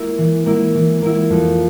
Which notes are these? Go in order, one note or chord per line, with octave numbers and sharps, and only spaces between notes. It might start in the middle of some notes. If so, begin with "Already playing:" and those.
Already playing: A#3 E4
E3
A#3 E4
E3
A#3 E4
F2